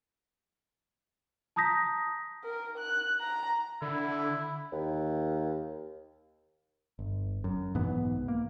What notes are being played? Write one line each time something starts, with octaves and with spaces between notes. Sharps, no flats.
A5 A#5 D#6 G6 A#6 B6
A#4
F#6
A#5
D3 E4
D#2
G1
F#2
B1 G#2 E3 B3
A#3